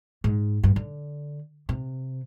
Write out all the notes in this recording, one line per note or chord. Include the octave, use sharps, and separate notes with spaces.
G#2
G2
D3
C3